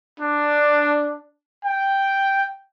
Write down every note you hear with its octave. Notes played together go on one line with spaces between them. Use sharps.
D4
G5